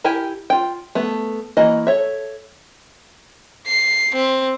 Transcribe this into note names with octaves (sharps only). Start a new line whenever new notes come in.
E4 G4 A#4 G5 G#5
F4 G5
A3 B3
E3 A#3 F#4 D#5
A4 C#5 E5
C7
C4